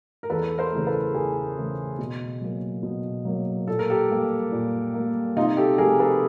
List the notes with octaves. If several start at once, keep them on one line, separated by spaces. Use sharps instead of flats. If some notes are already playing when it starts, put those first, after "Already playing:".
A#4
E2 A4 B4
A#4 C5
C#3 E3 A3
A4 B4
E2 G#4 A#4
C#3 E3 A3
B2
F#3 A#3
B2
F#3 A#3
A#2 A4
A#4
G4 A4
G3 A#3
A#2
G3 A#3
C3 D#4 F4
G4 A4
F3 A3 G#4 A#4
A4 B4